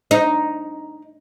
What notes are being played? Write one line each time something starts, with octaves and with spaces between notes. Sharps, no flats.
D#4